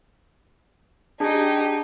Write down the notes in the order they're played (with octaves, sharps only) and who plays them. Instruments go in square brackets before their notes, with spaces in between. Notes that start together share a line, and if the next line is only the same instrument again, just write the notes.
[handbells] D4 G#4 [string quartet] D#4 G4